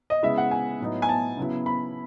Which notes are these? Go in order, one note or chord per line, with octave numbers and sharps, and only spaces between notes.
D#5
C#3 G#3 B3 E4 E5
F#5
G#5
A2 F#3 B3 D#4
G#5
A5
C#3 F#3 B3 E4
B5